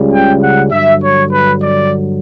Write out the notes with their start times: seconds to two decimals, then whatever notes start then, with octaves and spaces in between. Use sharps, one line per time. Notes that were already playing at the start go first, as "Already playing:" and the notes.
Already playing: C#2 C#3 G3
0.12 G5
0.42 F#5
0.72 G2 D3 F#3 E5
1.03 C#5
1.32 B4
1.63 D5